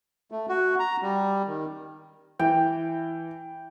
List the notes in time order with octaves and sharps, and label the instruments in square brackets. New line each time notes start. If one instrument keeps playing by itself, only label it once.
[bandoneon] A3
F#4
A#5
G3
D#3
[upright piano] E3 [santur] G5